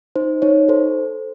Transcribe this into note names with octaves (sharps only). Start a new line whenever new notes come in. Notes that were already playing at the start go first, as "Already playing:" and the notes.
D#4 C5
D#4 C#5
A4 C5